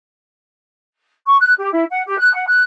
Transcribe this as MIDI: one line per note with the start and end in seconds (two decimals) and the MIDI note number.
1.26 1.35 85
1.40 1.53 90
1.57 1.68 67
1.72 1.84 64
1.90 2.02 78
2.06 2.18 67
2.18 2.33 90
2.34 2.46 78
2.47 2.62 90